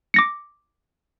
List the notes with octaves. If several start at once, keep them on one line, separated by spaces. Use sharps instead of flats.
D6 A#6 C#7